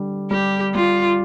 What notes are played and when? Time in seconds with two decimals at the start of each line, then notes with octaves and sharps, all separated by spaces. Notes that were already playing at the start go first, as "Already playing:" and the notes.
Already playing: D3 G3
0.31 G3 G4
0.74 G3 F4